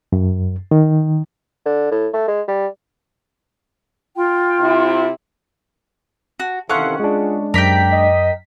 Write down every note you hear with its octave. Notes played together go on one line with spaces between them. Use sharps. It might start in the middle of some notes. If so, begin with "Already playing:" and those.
F#2
D#3
D3
A2
A3
G#3
G3
F4 G5 C6
C3 E4
F#4
C3 D#3 E3 C#4 A4 F5 F#5 C6
G#3 D4 F4 G#4
F#2 C3 A#4 D5 G5 B6
D#5